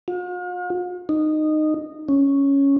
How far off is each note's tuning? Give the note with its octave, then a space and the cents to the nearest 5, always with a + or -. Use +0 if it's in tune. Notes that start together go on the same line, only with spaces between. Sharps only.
F4 +45
D#4 -15
C#4 +0